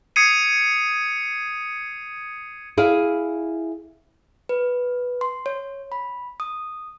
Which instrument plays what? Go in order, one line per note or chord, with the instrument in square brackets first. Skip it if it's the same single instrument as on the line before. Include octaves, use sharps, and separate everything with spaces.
[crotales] D#6 G#6 C7 C#7 D#7
[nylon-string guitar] E4 G#4 F5
[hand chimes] B4
C6
C#5
B5
D#6